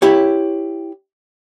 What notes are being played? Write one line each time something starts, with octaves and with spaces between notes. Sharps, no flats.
E4 G4 C#5